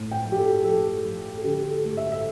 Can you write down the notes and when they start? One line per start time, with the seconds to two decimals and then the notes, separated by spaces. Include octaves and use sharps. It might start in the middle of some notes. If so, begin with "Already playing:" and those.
Already playing: A2
0.11 G5
0.25 F3
0.32 G4
0.38 A4
0.64 F3 A4
1.05 F3
1.37 A4
1.44 D3 G4
1.71 A4
1.84 A3
1.97 E5
2.12 E5